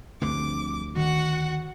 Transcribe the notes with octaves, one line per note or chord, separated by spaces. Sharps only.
D2 G2 D3 F3 C4 D6
D#3 F#4 F#5